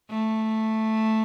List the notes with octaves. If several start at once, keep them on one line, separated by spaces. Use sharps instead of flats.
A3